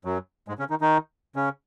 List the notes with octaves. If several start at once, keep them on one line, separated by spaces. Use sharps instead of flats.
F#2 F#3
G#2 G#3
C#3 C#4
D#3 D#4
D#3 D#4
C#3 C#4